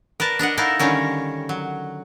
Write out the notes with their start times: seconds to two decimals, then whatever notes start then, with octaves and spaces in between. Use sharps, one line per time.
0.20 A#4 B4 D5 A5
0.39 D4 A#4 D#5 F#5
0.57 D#4 E4 A4 A#4 F5
0.79 D3 D#3 G3 C#4 A#4
1.49 F#3